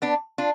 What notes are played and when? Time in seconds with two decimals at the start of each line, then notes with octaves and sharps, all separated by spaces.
0.02 B3 D4
0.38 D4 F4